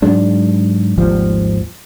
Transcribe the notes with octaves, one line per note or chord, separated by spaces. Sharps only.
G#2 F#3 G#3 D4
G#1 D#2 F3 G3